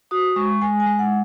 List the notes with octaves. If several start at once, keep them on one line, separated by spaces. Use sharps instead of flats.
F#4 D#6
G#3 C#6
G#3 G#5
G#5
G#3
F#5